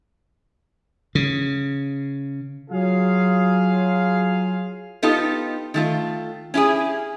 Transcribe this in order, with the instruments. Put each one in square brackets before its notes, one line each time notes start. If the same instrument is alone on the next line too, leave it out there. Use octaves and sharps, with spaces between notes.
[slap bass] C#3
[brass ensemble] F#3 F4 G#4 F5
[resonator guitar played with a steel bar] B3 D#4 F4 G4 A4
D#3 A3 F4
C#4 E4 G4 G#4